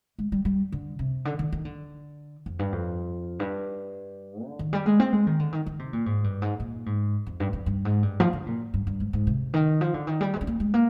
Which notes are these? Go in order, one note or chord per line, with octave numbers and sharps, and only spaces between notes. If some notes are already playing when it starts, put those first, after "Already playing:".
G#3
G3
G3
D3
C3
D3
D#3
D#3
D3
F2
G2
F2
G2
D3
D#3
G3
G#3
C4
G#3
D#3
D3
D#3
D#3
C3
A#2
G#2
G2
G#2
A#2
G#2
F2
G2
F2
G2
G#2
G2
F3
D3
A#2
G2
G2
G#2
G#2
C3
D#3
F3
D3
D#3
G3
G#3
C4
A#3
G#3
A#3